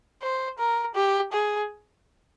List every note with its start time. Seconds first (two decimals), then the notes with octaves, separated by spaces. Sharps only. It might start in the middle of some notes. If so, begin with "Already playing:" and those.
0.23 C5
0.59 A#4
0.95 G4
1.33 G#4